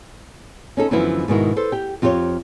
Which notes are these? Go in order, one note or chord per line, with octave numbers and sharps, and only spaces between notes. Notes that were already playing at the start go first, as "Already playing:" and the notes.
C#4 D#4 A4
F#2 D3 E3 F3 B3 E4
G#2 B2 D#3 E4
A4 B4 C5
G4 G5
F2 F4 G4 G#4 C#5